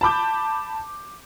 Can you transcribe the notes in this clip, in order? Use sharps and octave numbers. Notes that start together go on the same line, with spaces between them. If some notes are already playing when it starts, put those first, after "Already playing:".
A5 B5 D6 G6